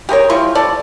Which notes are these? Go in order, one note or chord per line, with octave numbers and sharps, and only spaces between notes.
G4 G#4 A#4 C#5
G3 E4 F4 C#6
A4 D5 A5